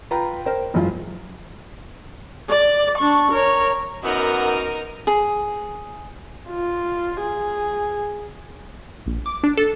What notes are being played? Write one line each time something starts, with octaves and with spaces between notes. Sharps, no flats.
F4 B4 G5 A#5 B5
A#4 C5 G5
F#1 C#2 F#2 F4
D5
D4 C#6
A#4 C#5
F#2 B3 D#4 A#4
G#4
F4
G#4
A#1
D6
D4
A4